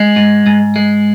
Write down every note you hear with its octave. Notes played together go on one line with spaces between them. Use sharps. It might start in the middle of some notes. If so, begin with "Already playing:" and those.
Already playing: G#3
G#2
G#2
G#3